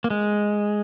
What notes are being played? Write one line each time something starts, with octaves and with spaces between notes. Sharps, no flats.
A#3
G#3